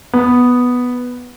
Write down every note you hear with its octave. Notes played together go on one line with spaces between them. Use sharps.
B3